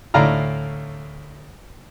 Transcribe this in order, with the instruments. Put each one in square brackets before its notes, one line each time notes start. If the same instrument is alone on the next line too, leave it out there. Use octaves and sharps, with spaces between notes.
[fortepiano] D2 A2 D5 F5 A#5 F6